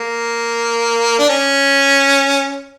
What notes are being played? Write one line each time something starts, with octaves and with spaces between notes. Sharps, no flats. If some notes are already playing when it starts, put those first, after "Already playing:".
Already playing: A#3
D4
C#4